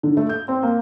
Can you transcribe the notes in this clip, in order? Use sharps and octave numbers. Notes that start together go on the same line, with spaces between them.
D3
A3
G6
C4
A#3